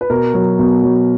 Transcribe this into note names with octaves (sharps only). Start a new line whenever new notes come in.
B4
B2 A#4
F#3
B2
F#3